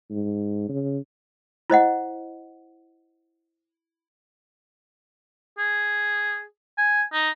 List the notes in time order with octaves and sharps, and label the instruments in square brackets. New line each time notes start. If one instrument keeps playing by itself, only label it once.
[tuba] G#2
C#3
[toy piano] E4 C5 D#5 F#5
[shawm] G#4
G#5
D#4